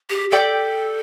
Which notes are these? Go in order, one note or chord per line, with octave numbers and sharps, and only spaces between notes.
G4
G4 A4 D5 G5